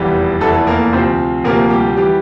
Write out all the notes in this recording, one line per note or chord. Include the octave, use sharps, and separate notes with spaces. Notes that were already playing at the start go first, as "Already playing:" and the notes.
Already playing: F1 E2 E3 G3 G4
F1 E2 E3 A3 A4
A#3 A#4
D2 C3 F3 C4 C5
D2 C3 F3 A#3 A#4
G3 G4
E3 G3 G4